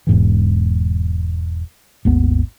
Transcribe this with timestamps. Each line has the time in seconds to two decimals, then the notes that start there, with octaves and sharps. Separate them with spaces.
0.07 E1 G#2 E3
2.05 G#1 D#2 B3